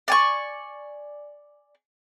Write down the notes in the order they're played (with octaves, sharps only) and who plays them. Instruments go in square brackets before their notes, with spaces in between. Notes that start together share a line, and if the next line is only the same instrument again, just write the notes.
[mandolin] D5 G#5 C#6